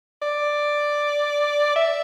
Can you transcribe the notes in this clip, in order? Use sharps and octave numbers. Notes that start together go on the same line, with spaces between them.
D5
E5